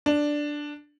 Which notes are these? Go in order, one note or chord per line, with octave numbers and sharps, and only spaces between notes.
D4